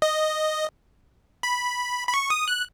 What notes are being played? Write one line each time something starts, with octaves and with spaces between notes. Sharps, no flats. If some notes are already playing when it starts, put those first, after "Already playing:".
D#5
B5
B5
C#6
D#6
F#6